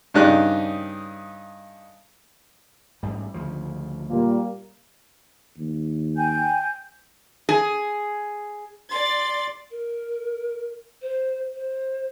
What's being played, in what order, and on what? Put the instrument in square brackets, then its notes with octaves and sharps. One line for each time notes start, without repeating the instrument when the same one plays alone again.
[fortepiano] G2 C#3 D4 D#4 G4 F#6
[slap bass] A1 G#2 G3
D2 C#3 F3
[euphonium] A#2 [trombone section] G3 A#3
[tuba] D#2
[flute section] G5 G#5 G6
[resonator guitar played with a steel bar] G#4
[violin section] D5 A6 [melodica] C6
[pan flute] A#4
C5
C5